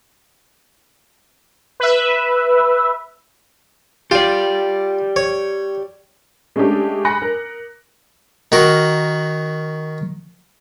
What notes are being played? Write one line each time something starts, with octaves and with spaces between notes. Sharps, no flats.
B4 E5
F4 G4 D5
C#5
G#3 A3 C#4 D4 G4 A4
G#5 B5 F#6 A#6 C#7
A#4
D#3 F#4 A#4